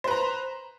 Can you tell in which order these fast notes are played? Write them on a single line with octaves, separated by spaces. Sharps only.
C5 B4 A#5